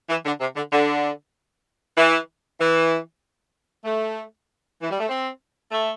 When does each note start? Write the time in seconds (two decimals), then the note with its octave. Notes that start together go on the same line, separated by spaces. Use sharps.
0.10 E3
0.26 D3
0.41 C3
0.56 D3
0.72 D3
1.97 E3
2.60 E3
3.84 A3
4.82 E3
4.91 G3
5.00 A3
5.08 C4
5.71 A3